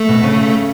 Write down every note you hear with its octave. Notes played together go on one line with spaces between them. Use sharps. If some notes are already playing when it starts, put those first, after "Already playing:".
Already playing: A3
B2
C#3